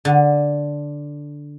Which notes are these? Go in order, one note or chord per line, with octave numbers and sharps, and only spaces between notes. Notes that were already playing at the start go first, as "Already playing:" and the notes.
D3